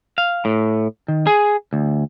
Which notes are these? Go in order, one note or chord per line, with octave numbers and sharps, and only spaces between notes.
F5
A2
D#3
G#4
D2